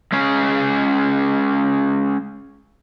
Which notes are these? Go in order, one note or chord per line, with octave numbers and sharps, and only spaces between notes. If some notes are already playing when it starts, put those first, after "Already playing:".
G#3 C#4 G#4